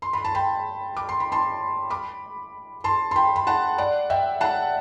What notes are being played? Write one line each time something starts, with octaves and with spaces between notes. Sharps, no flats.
C6
B5
A5
G5 B5
D6
C6
B5
A5 C6
B5 D6
A5 C6
C6
G5 B5
B5
F#5 A5
D5 F#5
E5 G5
F#5 A5